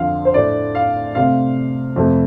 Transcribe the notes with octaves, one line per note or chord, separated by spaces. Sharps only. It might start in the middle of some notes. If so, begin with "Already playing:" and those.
Already playing: F2 D3 F3 F5
C5
A2 A3 D4 D5
F5
C3 A3 C4 F5
F2 C3 A3